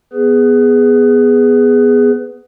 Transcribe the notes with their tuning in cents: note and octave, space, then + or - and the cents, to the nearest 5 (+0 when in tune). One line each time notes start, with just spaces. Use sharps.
B3 +0 G#4 +0 B4 +20